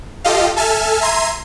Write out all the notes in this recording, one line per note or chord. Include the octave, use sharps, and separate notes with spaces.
F4 G4 A4 D#5 F5
A4 E5 G#5 A5 F6
E5 A#5 C6 G#6 C7 D#7